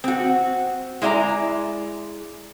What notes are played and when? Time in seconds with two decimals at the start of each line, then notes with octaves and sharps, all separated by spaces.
0.04 C4 F#4
1.02 G#3 E4 D5 D#5 A#5